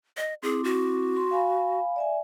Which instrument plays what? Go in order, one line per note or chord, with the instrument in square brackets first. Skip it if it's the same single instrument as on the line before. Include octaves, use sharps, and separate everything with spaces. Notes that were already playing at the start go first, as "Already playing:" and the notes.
[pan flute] D#5
[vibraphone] C4 E4 D6 [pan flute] G#4
[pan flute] F#4
[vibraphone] C6
F5 G#5 B5
D5 E5 G#5